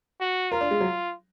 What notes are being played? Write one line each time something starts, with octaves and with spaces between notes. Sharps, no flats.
F#4
F4 A#4
D4
G#3
F#3